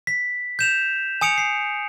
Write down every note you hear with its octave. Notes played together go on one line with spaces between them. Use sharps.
B6
G6 E7 F7
G#5 D#6 C#7 D7 F7
C7